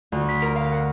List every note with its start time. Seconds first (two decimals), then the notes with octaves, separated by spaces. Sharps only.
0.12 D2
0.29 B6
0.42 A#4
0.56 F5
0.72 F#5